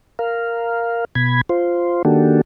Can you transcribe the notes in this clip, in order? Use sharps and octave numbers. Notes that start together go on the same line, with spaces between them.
A#4 F5
B2 B5 G#6
F4 C5
D#3 A#3 D4 F#4 G4 A4